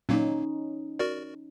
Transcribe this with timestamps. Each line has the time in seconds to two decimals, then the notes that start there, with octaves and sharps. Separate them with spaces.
0.09 A#2 F#3 A#3 C#4 D#4
0.99 F#4 A#4 D5